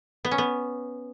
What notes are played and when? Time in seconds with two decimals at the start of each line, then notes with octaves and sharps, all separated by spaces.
0.25 B3
0.31 C#4
0.38 B3